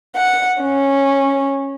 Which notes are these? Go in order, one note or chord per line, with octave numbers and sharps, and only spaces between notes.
F#5
C#4